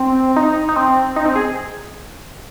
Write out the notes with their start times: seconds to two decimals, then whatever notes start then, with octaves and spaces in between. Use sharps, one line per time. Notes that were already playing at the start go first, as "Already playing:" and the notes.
Already playing: C4
0.36 D#4
0.69 D#4
0.76 C4
1.16 D#4
1.25 C4
1.36 G#4